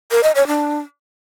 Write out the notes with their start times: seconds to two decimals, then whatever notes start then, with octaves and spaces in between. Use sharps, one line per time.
0.11 A#4
0.23 D#5
0.35 C#5
0.47 D4